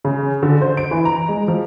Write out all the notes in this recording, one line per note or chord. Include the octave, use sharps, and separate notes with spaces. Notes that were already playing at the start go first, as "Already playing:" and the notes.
C#3
D3
C5
D7
E3
A#5
G#3
F3